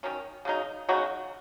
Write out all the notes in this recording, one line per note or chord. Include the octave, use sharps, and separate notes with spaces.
D#3 F#3 C#4
C#3 F#3 D#4
C#3 F#3 D#4 F#4